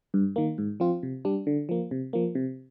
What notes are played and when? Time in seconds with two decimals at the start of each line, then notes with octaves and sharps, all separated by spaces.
0.14 G2
0.36 D#3 A#3
0.58 G#2
0.80 F3 C4 F4
1.03 C3
1.25 G3 D4
1.47 D3
1.69 F3 A#3
1.91 C3
2.13 F3 A#3
2.35 C3